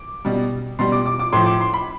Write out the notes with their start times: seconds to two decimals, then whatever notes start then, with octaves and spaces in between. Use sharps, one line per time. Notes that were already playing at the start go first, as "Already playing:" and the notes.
Already playing: D6
0.25 B2 G3
0.79 B2 G3 C6
0.92 D6
1.06 D6
1.19 D6
1.33 A2 F3 C6
1.46 D6
1.60 C6
1.74 B5